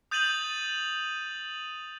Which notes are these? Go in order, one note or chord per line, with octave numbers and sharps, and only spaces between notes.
D#6 G6 A6 D#7 F7 F#7